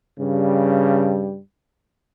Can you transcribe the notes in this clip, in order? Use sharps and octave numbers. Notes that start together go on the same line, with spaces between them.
G2 C#3 G3